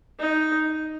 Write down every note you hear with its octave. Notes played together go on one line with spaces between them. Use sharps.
D#4